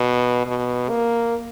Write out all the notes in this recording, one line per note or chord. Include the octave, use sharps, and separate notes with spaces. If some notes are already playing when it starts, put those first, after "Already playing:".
Already playing: B2
B2
A#3